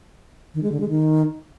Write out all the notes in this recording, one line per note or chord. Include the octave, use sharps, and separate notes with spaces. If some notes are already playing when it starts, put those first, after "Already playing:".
D#3
G#3
D3
G#3
D#3